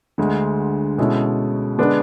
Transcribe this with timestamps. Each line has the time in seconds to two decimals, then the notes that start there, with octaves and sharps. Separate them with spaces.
0.18 D2 D3 G#3
0.98 B2 G#3 C#4 E4 A4
1.78 D3 G#3 B3 D4